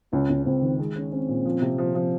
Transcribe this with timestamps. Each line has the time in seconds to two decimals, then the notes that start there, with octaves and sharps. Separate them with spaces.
0.13 C#2 C#4
0.30 C#2
0.46 C#2 C4
0.62 D#3
0.79 G#3
0.96 C#4
1.12 C4 C#4
1.29 A#2
1.45 F3
1.62 C3
1.78 F3
1.95 F3